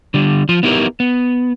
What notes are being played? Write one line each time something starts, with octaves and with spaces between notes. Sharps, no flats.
D3 G3
F3 F4
B3 D#4 E4 G4 A#4
B3